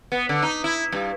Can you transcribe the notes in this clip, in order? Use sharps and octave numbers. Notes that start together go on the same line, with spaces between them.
B3
D3
D#4
E4
G2